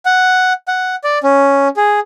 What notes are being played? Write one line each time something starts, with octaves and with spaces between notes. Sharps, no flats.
F#5
F#5
D5
C#4
G#4